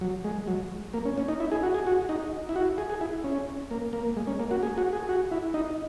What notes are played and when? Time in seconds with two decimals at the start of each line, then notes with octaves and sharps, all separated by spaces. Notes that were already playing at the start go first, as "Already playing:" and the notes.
0.01 F#3
0.24 G#3
0.47 F#3
0.94 A#3
1.05 C#4
1.18 C#4
1.28 D#4
1.40 E4
1.52 G#4
1.63 F#4
1.74 G#4
1.87 F#4
2.09 D#4
2.49 E4
2.56 F#4
2.78 G#4
2.90 G#4
3.01 E4
3.24 C#4
3.71 A#3
3.93 A#3
4.17 G#3
4.27 C#4
4.39 A#3
4.51 F#4
4.63 G#4
4.78 F#4
4.93 G#4
5.09 F#4
5.31 E4
5.54 D#4